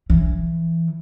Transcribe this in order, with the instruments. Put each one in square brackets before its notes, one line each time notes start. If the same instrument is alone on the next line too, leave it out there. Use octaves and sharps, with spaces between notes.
[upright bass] E3